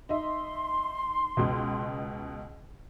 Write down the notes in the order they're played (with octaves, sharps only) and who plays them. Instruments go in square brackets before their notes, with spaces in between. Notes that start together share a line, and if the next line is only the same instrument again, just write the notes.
[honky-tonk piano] D#4 D#5 E5 [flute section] C6
[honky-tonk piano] C#2 B2